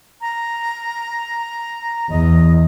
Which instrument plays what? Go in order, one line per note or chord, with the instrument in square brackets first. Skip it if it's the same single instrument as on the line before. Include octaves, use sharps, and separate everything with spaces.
[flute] A#5
[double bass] E2 [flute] D#5